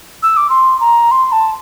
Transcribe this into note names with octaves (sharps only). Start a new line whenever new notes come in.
E6
D6
C6
A#5
C6
A5